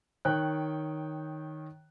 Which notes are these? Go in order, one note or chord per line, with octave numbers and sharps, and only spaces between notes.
D#3 C#5 G5 F#6